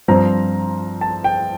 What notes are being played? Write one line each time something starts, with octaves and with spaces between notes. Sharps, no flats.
G2 F3 C4 A#5
A5
G5